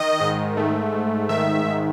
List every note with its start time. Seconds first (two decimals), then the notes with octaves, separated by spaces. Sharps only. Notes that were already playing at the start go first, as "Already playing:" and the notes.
Already playing: D#3 D#5
0.20 G#2
0.57 A3
0.92 G#2
1.29 D#3 E5
1.65 G#2